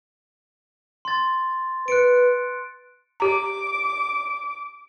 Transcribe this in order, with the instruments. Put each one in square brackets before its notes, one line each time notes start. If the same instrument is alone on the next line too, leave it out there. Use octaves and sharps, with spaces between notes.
[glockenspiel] C6 A6
[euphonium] B4 [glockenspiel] F#6 C#7 D7
[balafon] G4 A#5 [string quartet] D6